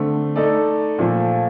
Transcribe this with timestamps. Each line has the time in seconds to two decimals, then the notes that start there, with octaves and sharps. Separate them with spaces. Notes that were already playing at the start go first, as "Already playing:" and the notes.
Already playing: D3 A3 C4
0.36 A3 D#4 A4 D5
0.98 A#2 F3 A3